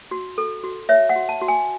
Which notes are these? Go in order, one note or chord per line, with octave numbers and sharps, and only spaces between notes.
F#4
A4
F#4
C#5 E5
F#5
F#4
A5
F#4
G#5